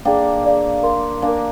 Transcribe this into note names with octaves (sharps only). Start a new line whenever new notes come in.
A#3 D4 G#4 D5 G5
G#4 D5 F5
A#4 F5 C6
A#3 D4 A#4 F5 G#5